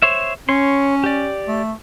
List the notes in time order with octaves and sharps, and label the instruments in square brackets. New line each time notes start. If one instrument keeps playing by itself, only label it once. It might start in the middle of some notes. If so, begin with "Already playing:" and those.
[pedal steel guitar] C5 C#5 E5
[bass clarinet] C#4 [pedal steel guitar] C#5 C6
[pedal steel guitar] G4 D5
[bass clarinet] A3